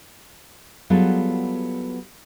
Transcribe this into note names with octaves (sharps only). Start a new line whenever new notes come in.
F#3 G3 B3 F4 G#4 A4